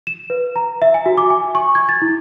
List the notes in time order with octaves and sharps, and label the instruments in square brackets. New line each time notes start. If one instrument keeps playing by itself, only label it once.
[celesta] E7
B4
A#5
E5
G#5
F#4
D6
G#5
C#6
G#6
A6
E4